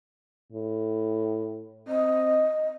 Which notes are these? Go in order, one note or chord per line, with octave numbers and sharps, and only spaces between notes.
A2
C4 D#5